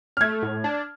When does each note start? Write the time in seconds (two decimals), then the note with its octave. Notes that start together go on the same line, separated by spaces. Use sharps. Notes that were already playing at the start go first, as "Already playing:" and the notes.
0.17 F6
0.21 A3 G#6
0.43 A2
0.64 D4